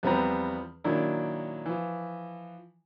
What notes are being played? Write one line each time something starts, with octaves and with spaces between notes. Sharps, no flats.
E2 F3 G3 B3 C4 A#5
A#2 D#3 F#3 D4 E4
E3 F3